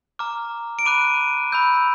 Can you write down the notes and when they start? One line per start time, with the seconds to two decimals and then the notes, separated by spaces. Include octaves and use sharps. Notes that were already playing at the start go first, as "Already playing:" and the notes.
0.19 A#5 D6 F6
0.79 D7
0.85 B5 D6 F#6 D#7
1.52 B5 E6 G6